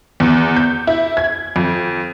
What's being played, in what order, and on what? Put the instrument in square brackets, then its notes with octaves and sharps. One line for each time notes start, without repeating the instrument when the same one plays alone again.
[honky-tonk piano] E2
G6
E4
G#6
F2